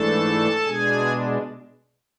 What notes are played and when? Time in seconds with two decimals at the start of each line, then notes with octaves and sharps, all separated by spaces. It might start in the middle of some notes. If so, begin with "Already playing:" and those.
Already playing: G#2 E3 A3 D4 A4 A5
0.65 B2 G#3 D4 G#4 G#5